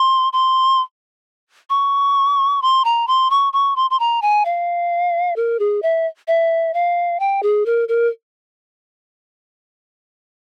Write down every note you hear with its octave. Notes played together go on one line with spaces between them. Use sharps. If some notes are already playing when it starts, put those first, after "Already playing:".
Already playing: C6
C6
C#6
C6
A#5
C6
C#6
C#6
C6
C6
A#5
G#5
F5
A#4
G#4
E5
E5
F5
G5
G#4
A#4
A#4